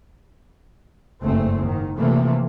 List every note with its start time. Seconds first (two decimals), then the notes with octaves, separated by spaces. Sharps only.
1.21 F#1 G2 A3 C4
1.61 G#2 D#3
1.98 C3 E3 F3 A3 A#3